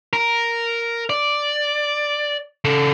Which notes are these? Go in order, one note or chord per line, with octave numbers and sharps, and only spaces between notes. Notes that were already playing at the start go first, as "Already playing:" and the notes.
A#4
D5
C#3 A4